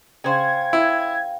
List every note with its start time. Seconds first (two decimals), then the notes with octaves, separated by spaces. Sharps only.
0.24 C#3 C5 F5 G5 G#6
0.73 E4